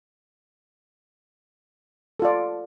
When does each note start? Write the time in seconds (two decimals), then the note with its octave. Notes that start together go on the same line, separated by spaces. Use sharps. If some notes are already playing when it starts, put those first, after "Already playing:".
2.20 A4
2.22 F4
2.25 D5